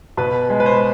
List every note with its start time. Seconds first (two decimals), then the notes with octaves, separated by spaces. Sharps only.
0.17 B2 B4
0.50 G#3
0.60 B4
0.66 C5